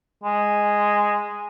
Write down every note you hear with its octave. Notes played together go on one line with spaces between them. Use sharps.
G#3